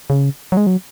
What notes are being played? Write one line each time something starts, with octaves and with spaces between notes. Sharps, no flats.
C#3
F#3
G#3
F#3